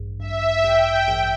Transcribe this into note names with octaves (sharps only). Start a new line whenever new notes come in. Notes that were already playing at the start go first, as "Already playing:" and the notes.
Already playing: A1 G2
G2 E5
A1 G5
A1